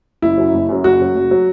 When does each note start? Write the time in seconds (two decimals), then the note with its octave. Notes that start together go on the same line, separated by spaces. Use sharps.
0.22 F#1 E4
0.38 F#2 F#3
0.54 F#1
0.69 F#2 F#3
0.84 F#1 F#4
1.00 F#2 F#3
1.15 F#1
1.31 F#3